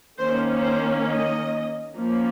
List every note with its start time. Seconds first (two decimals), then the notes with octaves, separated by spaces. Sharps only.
0.18 D#3 A#3 C#4 C5
0.62 C5
1.06 D#5
1.94 F3 A#3 C#4